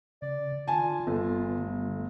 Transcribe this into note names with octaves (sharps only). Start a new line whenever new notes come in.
C#3 D5
D3 D#3 F4 G#5 A5
G1 B3
D3 G3 A3